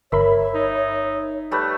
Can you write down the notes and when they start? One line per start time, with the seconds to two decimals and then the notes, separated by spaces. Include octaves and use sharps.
0.12 G1 A#4 C#5 E5 B5
0.54 D#4
1.51 G3 A3 B4